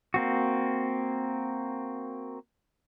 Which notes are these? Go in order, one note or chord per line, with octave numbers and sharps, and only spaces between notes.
A#3 C4 F#4